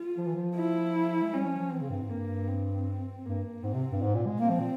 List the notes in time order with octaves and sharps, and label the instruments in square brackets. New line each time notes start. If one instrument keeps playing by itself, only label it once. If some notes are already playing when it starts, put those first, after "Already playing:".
Already playing: [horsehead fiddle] F4
[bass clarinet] F3
E3
F3
[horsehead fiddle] E4
[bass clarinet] G#3
[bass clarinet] G3 [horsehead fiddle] C#4
[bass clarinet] F3
F3
[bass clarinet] E3 [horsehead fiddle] C4
[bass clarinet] C#3
G2
G#2
[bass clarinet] G2 [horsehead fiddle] A#3
[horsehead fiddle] C4
[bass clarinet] G2 [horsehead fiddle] A#3
[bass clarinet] G#2 [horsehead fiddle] C4
[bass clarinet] C3
G2
G#2
A#2
G#3
[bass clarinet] A#3 [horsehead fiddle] C4
[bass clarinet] F3
A#2